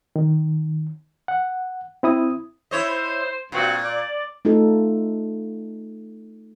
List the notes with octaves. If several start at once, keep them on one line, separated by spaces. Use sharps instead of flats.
D#3
F#5
C4 E4 D#6
E4 C5 C#5 D#5
G2 A#2 C4 F#4
D5
A3 D#4 F4 A4